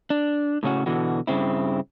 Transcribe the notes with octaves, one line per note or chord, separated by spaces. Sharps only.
D4
A2 C#3 C#4 F#4
B2 D3 E3 F#4
G2 A#2 C#3 C4 E4